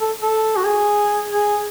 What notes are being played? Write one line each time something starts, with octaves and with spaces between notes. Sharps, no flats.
A4
A4
F#4
G#4
G#4